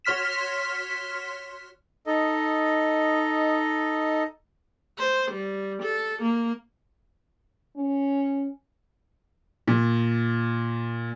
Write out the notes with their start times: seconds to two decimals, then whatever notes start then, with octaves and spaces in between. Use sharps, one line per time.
0.05 F#4 C#5 C6 F6 B6 E7
2.06 D#4 A4 D#5
4.98 C5
5.32 G3
5.83 A4
6.22 A#3
7.77 C#4
9.68 A#2